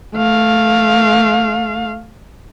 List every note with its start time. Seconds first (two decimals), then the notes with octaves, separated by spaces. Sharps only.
0.16 A3 F5